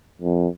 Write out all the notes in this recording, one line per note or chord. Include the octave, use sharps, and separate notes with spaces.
F2